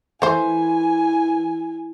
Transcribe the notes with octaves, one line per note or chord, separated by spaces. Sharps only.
E3 A3 C5 G#5